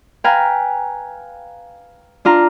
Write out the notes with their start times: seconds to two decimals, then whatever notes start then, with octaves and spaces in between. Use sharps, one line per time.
0.24 B4 F5 G5 G#5 A#5
2.25 D4 F4 A#5